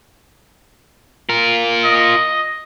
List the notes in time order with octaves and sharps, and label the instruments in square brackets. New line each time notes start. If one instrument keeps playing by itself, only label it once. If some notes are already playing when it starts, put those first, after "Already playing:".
[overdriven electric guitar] F4 A#4
[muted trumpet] D#5